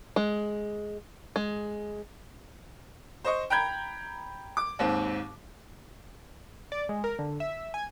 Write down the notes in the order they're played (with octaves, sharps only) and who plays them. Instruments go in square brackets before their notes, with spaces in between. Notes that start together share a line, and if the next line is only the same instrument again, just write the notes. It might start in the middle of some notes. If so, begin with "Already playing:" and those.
[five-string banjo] G#3
G#3
[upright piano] C5 D#5 C#6
G5 A#5 B5 G6 G#6
D6
D#2 G#2 C4
[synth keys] D5
G#3
A#4
D3
E5
G#5